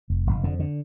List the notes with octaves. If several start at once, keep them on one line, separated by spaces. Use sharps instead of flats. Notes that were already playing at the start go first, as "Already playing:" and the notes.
F1
F1
F2 D3
D3